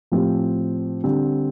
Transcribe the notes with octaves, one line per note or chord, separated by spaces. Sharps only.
A2 F3 C4 G4
D3 G3 C4